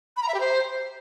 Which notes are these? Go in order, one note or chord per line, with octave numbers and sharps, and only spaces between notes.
B5
A#5
E5
G4
C5